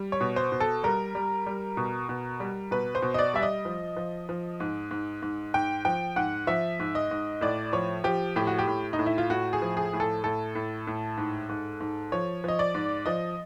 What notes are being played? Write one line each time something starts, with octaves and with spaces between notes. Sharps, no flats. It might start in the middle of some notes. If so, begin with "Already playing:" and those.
Already playing: G3
C#5
B2
C5
B2
A4
G3 A#4
G3
G3
B2
B2
G3
B2 B4
C5
B2
D#5
D5
G3 E5
D#5
F3
F3
F3
G#2
G#2
G#2
G#2 G5
F3 G5
G#2 F#5
F3 E5
G#2
D#5
G#2
A2 D5
F3 C#5
F3 G4
A2 G4
F#4
G4
A2
D#4
A2
E4
F4
A2 F#4
G#4
F3
G#4
A2
A4
A2 A4
A2
A2
G#2
G#2
G#2
F3 C#5
F3 D#5
D5
G#2
F3 D#5